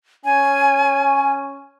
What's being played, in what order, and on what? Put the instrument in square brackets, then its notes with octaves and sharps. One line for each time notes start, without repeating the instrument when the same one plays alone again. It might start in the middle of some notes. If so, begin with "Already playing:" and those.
[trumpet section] C#4 [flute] G#5